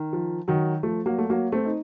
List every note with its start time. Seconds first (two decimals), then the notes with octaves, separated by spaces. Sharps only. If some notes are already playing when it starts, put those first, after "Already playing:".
Already playing: D#3
0.13 F3
0.48 D#3 F#3
0.83 F3 A3
1.06 F#3 A#3
1.18 A3
1.30 F#3 A#3
1.52 A3 C4
1.65 D#4